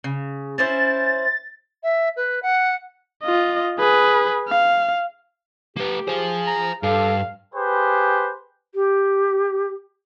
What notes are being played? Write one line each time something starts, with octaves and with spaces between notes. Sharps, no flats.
C#3
C#4 E4 C5 A6
E5
B4
F#5
F4 D#5
G#4 B4
F5
A#3 G4 B4
G#4 C5 F5
A#5
G2 A4 F5
G4 G#4 B4 C5
G4